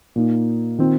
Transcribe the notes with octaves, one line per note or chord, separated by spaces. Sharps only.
A#2 A#3 D#4
D#3 C4 F4